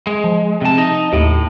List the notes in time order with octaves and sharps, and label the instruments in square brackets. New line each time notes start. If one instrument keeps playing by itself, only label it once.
[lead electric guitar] G#3
[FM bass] F3
[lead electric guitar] C3 A5
D#4 D#5
[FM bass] D#2 [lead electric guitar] A2